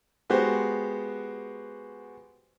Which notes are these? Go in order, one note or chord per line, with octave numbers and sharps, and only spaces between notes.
G#3 B3 F#4 G4 C5